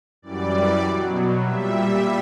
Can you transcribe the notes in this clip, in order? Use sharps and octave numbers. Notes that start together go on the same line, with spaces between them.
F#2 E3 G3 D5
B2 F#3
A#2 G3 E5